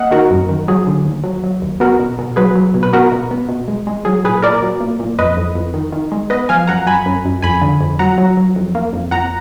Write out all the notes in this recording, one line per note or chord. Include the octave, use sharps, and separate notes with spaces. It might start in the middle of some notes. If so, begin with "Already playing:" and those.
Already playing: A#3 D#5 F5 F#5
D#3 F#4 A#4
F#2
D#3
F#3 G#4
D3
D#2
F#3
F#3
D#2
B3 F#4 A#4
B2
B2
F#3 G#4 B4
F#3
B2
B4
B3 F#4 A#4
B2
B3
B2
G#3
G#3
F#3 G#4
A#2 G#4 B4
A#2 A#4 D5
F#3
A#2
A#2
F2 B4 D#5
F2
F2
D#3
D#3
G#3
B3 B4 D#5
F3 F5 G#5
F#2 F#5 A#5
F#2 G#5 B5
F#2
F#2
F2 G#5 B5
D3
F2
F#3 F#5 A#5
F#3
F#3
F2
A#3
F2
F2 F#5 A#5